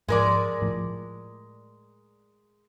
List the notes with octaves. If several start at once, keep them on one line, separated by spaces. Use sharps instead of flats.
G#2 F3 G#3 A#4 D5
A2 F3